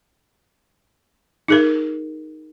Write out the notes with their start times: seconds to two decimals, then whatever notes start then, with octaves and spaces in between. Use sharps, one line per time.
1.48 D#4 G#4 A#4